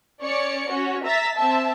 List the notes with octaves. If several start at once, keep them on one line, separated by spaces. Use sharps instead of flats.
C#4 C#5 D5 C#7
C#4 F#4 C#5
E5 A#5 A6 B6
C4 E5 A5